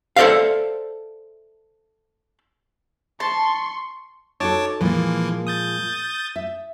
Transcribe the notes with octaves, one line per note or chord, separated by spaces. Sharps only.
A4 C5 D5 E5 F5
A5 C6 C#6
D#4 F#4 A4 C#5 A5 D6
A#2 E3 F3 G#3 A#3
D#6 G6 A6
E5